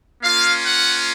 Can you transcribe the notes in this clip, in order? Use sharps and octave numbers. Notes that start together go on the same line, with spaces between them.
A#3 C#4 F4 F5
F#5